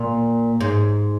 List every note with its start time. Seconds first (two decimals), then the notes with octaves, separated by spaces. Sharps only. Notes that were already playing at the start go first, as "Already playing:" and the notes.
Already playing: A#2
0.61 G#2